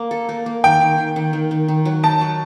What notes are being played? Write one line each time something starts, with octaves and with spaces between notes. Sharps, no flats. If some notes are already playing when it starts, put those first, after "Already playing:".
Already playing: A#3
A4
A#3
A#3
D#3 G5
D#3
D#3
D#3
D#3
D#3
D#3
F#3
D#4 A5
F#3